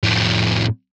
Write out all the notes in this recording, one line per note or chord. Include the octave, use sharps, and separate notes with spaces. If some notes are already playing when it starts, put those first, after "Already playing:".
F2 A2